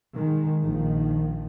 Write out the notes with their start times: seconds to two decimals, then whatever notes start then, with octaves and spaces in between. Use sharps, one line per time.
0.16 D#3 G#3
0.62 A#1 D#3 F3